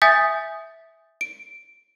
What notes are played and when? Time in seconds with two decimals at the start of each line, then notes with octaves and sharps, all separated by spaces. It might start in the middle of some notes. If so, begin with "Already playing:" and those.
0.02 E5 G#5 D#6 G6 A6 B6
1.21 D7